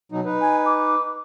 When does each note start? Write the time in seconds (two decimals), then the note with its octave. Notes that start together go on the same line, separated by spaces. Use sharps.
0.12 B2 F#3 D#4
0.25 D#4 B4
0.41 G#5
0.66 D6